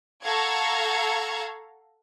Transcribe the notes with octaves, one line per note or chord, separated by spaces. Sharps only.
A4 F5 F#5 A#5 C#6 G#6